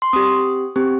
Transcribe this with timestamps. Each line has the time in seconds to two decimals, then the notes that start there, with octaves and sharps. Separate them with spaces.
0.02 C6
0.13 C4 G4 D#6
0.76 C4 G4